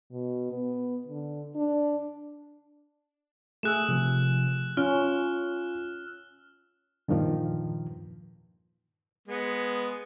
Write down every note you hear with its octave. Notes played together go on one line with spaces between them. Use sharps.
B2
B3
D3
D4
A3 G#4 E6 F#6 E7
C3 F3
C#4 F4 F6
E2 G2 A#2 D#3 F3
G#3 B3